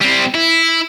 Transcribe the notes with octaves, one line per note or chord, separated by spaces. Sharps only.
G3 C4
E4